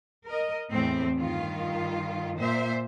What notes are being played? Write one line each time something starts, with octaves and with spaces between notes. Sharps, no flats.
A#4 D#5
E2 A2 C4
G2 D#3 F4
A#2 C5 E5